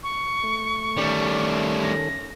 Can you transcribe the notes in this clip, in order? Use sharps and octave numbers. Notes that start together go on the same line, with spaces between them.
C#6
A3
D#3 G3 A3 C#4 A4
A#6